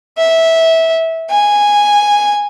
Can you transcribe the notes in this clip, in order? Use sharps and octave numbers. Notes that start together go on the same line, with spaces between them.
E5
G#5